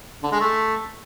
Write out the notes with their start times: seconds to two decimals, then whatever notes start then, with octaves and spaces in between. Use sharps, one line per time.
0.23 D3
0.32 G#3
0.40 A3